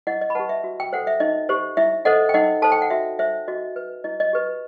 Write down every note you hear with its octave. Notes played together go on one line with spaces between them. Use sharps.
E4 D#5 F#5
D#5
B5
G4 B4 F#5 A5
E5
F#4
G5
A4 C5 F#5
E5
D#4 D#5
G4 C5
E4 E5
A4 C5 D#5 F#5
G5
D#4 D#5 F#5
A4 C5 A5
G5
F#5
F#4 E5
C5 E5
F#4 D#5
B4
E4 D#5
D#5
G4 B4